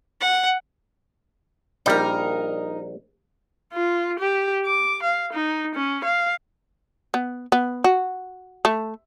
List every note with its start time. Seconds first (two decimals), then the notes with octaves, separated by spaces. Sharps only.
0.20 F#5
1.86 A#1 G3 D#4 A#4
3.73 F4
4.20 G4
4.66 D6
5.03 F5
5.33 D#4
5.75 C#4
6.04 F5
7.14 B3
7.52 B3
7.84 F#4
8.65 A3